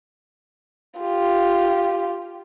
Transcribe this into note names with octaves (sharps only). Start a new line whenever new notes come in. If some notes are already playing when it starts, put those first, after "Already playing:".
F4 G4